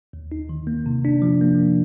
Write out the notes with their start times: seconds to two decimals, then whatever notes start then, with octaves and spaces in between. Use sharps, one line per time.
0.13 D#2
0.32 D#4
0.49 D#3
0.67 A#3
0.86 C3
1.05 D4
1.22 F3
1.41 A#3